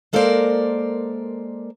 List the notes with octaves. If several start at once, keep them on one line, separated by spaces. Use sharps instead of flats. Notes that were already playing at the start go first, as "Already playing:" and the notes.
G#3 A#3 A4 A#4 C5 D5